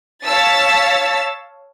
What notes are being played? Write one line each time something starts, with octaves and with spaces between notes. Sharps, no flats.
C#5 F5 A5 E6 A6 B6